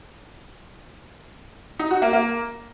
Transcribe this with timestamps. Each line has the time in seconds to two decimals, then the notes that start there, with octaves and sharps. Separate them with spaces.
1.79 D#4
1.91 F#4
2.02 A#3
2.13 A#3